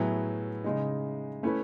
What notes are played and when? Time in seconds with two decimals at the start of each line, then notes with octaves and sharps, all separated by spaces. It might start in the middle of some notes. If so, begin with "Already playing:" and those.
Already playing: A2 F#3 B3 E4 G#4
0.64 C#3 G#3 D#4
1.43 A3 C#4 E4 B4